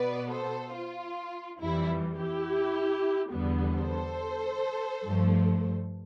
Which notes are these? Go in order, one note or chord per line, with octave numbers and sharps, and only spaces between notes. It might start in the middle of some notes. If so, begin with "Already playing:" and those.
Already playing: B2 B3 B4 D5
A4 C5
F4
F2 E3 G3 E4
E4 G4
E2 D3 G3 B3
A4 C5
G2 F3 A3